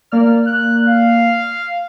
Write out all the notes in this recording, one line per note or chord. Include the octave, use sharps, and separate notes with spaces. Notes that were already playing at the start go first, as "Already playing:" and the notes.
A#3 D5 F6
F#6
F5